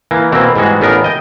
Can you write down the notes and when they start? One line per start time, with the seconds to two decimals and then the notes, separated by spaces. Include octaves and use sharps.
0.11 E3 A#3
0.32 B2 E3 A#3 C4 E4
0.56 G#2 E3 G3 G#3 F#4
0.81 A1 C#3 B3 D4 A#4
1.04 D#5 G5